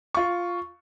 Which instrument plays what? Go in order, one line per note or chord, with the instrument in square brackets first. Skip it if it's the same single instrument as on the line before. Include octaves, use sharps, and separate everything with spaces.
[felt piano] F4 C#6